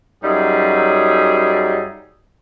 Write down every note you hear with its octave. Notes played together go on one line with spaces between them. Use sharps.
F#2 F#3 G3 D#4 G#4 E5